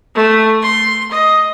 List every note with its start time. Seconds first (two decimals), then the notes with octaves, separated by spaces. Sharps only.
0.15 A3
0.62 C6
1.11 D#5